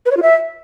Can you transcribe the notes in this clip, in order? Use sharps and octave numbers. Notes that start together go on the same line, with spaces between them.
B4
C#5
F4
E5